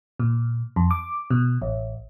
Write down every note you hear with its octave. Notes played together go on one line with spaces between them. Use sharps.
A#2
F2
D6
B2
A1